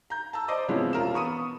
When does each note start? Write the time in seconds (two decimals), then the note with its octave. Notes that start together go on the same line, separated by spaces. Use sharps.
0.10 A#5 G6
0.33 A5 A#5 E6
0.48 C5 D5 D#5 D6
0.68 C3 E3 F3 G#3 B3 C#4
0.93 E1 F4 A#4 E7
1.14 B3 C#6 D#6 D#7